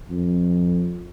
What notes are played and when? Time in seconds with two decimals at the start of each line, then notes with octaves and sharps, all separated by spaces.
0.10 F2